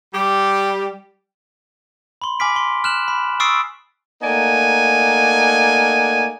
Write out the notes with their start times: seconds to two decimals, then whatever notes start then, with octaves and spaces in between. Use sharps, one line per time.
0.14 G3 G4
2.22 B5 C6
2.40 G#5 B5 D6 F6 B6 D7
2.56 C6
2.84 F6 F#6 E7 F#7
3.08 B5
3.40 C#6 D#6 E6 A6 C7 D7
4.22 A3 A#3 D#4 D5 F#5 G#5